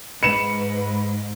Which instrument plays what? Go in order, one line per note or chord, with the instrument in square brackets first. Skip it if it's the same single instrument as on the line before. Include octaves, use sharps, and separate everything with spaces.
[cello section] G#2 [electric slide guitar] B4 [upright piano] C#7 E7